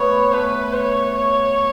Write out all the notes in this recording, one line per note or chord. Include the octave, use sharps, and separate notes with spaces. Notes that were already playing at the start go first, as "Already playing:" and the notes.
Already playing: A3 B3 C#5
A3 B4
C#5
C#5